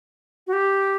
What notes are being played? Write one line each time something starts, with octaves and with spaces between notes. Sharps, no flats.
F#4
G4